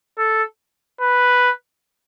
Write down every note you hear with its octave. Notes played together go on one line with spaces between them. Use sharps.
A4
B4